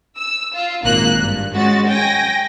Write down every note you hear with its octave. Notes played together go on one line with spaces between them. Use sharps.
E6
F4
G#1 A#2 A#3 F#6
G2
G#3 C#4 F#4 A6
G5 G#5 A#6